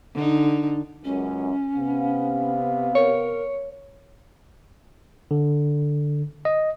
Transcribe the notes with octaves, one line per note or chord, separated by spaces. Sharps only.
D3 D#4
C#2 F#2 C#4
C3 B3 F5
A#4 C#5
D3
D#5